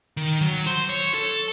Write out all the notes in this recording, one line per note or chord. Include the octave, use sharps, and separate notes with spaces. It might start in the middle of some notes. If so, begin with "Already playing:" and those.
D#3
F#3
C5
C#5
A4